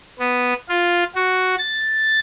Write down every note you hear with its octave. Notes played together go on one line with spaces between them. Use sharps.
B3
F4
F#4
A6